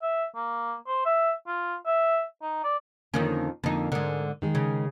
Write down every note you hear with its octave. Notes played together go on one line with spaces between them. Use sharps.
E5
A#3
C5
E5
F4
E5
D#4
D5
F2 D3 D#3 A#3 C#4
F2 D3 A#3 D#4
G#2 D3 A#4
D#3 G#3 G#4
C#3